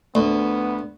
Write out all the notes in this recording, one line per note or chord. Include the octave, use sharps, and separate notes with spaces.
D2 B3